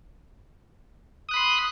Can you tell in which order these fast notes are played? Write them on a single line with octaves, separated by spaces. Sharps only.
D#6 F#6 B5 C6